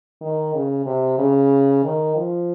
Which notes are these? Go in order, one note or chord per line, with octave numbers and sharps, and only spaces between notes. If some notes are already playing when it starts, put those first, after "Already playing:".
D#3
C#3
C3
C#3
D#3
F3